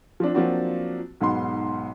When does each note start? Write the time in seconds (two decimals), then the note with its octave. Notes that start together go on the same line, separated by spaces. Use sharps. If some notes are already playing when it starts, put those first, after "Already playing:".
0.20 F3 C4 D4
0.34 F3 F#3 A#3 C4 D4 F#4
1.21 B1 G#2 B3 C6